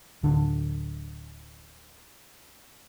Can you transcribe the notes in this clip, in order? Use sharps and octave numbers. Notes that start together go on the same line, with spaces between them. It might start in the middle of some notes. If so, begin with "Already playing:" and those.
D1 D3